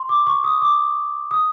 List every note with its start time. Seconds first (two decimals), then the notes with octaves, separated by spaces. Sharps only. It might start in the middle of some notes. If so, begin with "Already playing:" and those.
Already playing: C6
0.09 D6
0.27 C#6
0.44 D#6
0.62 D6
1.31 D#6